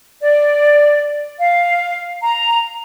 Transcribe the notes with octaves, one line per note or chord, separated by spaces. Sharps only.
D5
F5
A#5